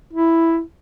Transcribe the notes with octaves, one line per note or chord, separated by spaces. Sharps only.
E4